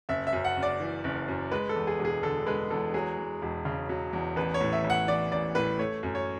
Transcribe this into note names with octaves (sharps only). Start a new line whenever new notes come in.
F#1 E5
E5
F#2
F#5
F#1
D5
E3
F#1
F#2
G#3 B4
A4
E2
G#4
E1
G#4
D3 A4
G#3 B4
E2 A4
F#3 G#4
E2
E1
C#3
F#3
E2
A1 B4
C#5
A2
E5
A1
F#5
E3 D5
A1 D5
A2 B4
A3 C#5
F#2
C#5